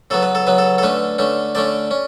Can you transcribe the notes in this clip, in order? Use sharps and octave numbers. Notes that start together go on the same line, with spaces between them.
C#3 F#3 B3 A4
B4
A4
C#3 F#3 B3 B4
A4
A4
D3 A3 C#4 B4
D3 A3 C#4
D3 A3 C#4 D5
C#4